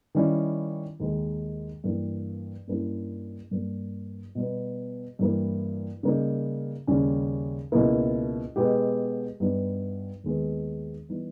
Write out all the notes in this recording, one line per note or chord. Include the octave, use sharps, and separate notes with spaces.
D#3 G3 C#4 E4
D#2 D#3 G#3
G2 E3 A#3
G2 G3 A#3 C#4 E4
G2 G3 A#3
B2 G3 B3
G2 E3 G3 A#3 E4
C#3 G3 A#3 D#4
D#2 C#3 G3 C#4
C#2 B2 A#3 E4
B2 G#3 B3 G4
G2 G3 B3 D#4
D#2 D#3 G#3 B3
E3 G3 B3 D#4